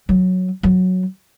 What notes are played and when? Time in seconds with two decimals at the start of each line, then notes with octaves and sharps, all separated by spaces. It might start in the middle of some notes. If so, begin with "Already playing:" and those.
0.09 F#3
0.63 F#3